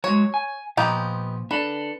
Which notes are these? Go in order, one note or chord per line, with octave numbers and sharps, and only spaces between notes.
F#3 G#3 C#5
G#5
A#2 F3 B3 D#4 G4
D4 A4 B4 D5